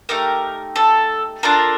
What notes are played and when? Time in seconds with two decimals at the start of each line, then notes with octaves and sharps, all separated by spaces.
0.09 A3 D#4 G4 A#4
0.76 A4
1.43 D4 F4 A4 A#4